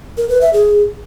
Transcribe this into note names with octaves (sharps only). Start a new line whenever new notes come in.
A#4
B4
E5
G#4